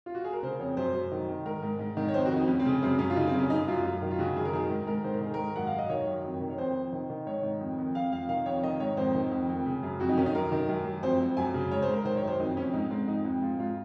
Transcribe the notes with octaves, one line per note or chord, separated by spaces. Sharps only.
F4
F#4
G#4
A#4
C#3 C5
F2 C#5
F#2 C5
F#2
D#3
D#3
G#2 A#4
G#2
G#2
D#3
C#5
F2 C5
F#4
F2 D#4
F2 C#4
C4
C#3
F#2 C4
F#2 C#4
F4
C#3 D#4
C4
F#2
C#4
F#2 D#4
F#2 F4
F#2
D#3
F4
C#3 F#4
F#2 G#4
A#4
D#3 G#4
G#2
G#2 A#4
D#3 C5
A#4
D#3 G#4
G#2 A#4
F#2 F#5
F5
F#2
D#5
D#3 C#5
F#2
F2
D#3
C#5
F2 C5
F2
D#3
D#3
G#2 C#5
D#3
F2
F2
F2 F5
F2 F5
D#3 F5
F2 C#5
D#3 D#5
G#2 C#5
F2 C5
D#3
F2
F2
C#3
F#2
F2 F#4
D#4
D#3 C#4
D#4
F#2 A#4
D#3
F#2
F#2
F2 C5
F2
F#2 G#5
C#3
G#2 C#5
C5
G#2
A#4
D#3 C5
C#5
F#2
C5
F2 D#4
F2 C#4
G#2 D#4
G#2 C4
F2 D#4
F2
G#2 F4
G#2 F4